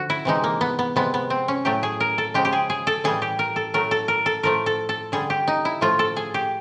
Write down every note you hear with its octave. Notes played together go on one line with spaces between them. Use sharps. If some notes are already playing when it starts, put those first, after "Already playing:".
Already playing: D3 F3 F#4
E4
C3 E3 G#3 D#4
A#3
B3
B3
C3 F3 G#3 B3
B3
C4
C#4
A2 F#3 A3 G4
G#4
A#4
A4
C#3 F3 G#3 G4
G4
G#4
G#4
A4
A2 E3 G3 G#4
G4
A#4
A4
A2 F#3 A3 A#4
A4
A#4
A4
A2 F3 A3 A#4
A4
A4
D3 G3 G#4
G4
D#4
E4
A2 F3 A3 F4
A4
G#4
G4